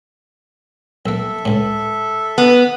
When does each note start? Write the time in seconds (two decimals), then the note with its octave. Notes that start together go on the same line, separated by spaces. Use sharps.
1.06 B1 A#3 A4 E5
1.45 C#2 A2
2.38 B3